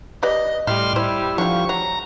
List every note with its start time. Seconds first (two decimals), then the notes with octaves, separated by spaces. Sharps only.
0.23 G4 B4 D5 D#5
0.67 A2 G3 E4 C6 F6
0.96 E4 C5
1.38 D3 F3 F4 C#6
1.69 F#3 A#5